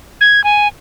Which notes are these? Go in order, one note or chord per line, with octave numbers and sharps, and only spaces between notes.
G#6
G#5